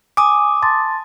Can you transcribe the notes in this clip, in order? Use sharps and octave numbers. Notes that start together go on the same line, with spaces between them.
G#5 D6 D#6
A5 C6 A6